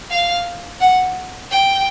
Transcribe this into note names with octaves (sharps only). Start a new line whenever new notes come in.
F5
F#5
G5